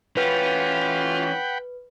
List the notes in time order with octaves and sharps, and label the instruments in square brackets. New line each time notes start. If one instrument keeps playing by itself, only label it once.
[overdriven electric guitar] E3 C#4 [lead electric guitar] F4 [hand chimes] B4 [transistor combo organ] F#5 G5 B5